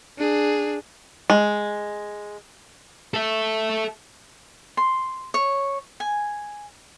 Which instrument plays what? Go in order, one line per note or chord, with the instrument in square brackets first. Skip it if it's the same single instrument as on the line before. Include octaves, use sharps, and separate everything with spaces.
[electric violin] D4 G#4
[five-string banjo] G#3
[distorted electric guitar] A4 E5
[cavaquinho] C6
C#5
G#5